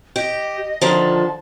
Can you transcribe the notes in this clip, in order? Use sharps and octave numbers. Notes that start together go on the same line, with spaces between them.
G4 D#5
D3 D#3 F3 A5